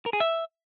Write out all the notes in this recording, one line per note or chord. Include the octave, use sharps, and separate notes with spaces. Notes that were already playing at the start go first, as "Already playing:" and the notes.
A#4
G#4
E5